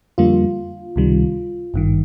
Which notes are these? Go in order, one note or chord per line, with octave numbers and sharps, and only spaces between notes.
F2 D3 G3 A#3 F4
C#2 C3 D#3 G3
G#1 G2 D#3